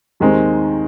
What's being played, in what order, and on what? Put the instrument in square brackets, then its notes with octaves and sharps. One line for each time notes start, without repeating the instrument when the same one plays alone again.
[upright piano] D#2 D#3 G#3 C4